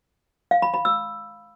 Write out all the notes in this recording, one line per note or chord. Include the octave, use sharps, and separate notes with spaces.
F5
B5
B5
E6